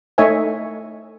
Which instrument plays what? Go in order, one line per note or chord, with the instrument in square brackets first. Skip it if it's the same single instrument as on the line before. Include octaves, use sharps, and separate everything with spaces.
[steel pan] A3 D#4 C#5 D#5 E5 G#5